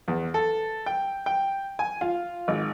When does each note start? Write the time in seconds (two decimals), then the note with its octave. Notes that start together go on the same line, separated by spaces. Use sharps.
0.08 E2
0.34 A4
0.86 G5
1.26 G5
1.79 G#5
2.01 F4
2.48 G#1